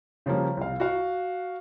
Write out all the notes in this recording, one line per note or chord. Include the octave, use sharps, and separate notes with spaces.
C#3 F3 G3 A#3 C#4
C2 F5
F#4 F5